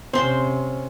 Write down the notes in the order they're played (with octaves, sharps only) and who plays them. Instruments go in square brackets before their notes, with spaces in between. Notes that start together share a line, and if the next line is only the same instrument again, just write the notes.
[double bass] C3 C#4 [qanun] C4 C6 [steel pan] C5